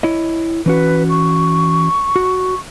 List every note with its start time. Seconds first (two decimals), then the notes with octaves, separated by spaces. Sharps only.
0.03 E4 C#5 D#5
0.66 E3 C#4 F#4 B4
1.10 C#6
2.16 F#4